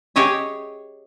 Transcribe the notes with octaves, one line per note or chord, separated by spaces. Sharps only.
G4 G#4 C#5 D#5 E5